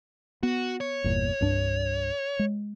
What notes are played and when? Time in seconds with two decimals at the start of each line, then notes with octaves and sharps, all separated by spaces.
0.43 B3 F#4
0.81 C#5
1.04 G1 E2 A#2
1.41 C2 G2 D4
2.39 G#3